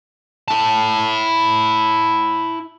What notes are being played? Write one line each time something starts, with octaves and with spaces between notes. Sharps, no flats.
E4 A5